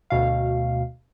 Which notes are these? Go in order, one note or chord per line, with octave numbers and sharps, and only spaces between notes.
D2 B2 F5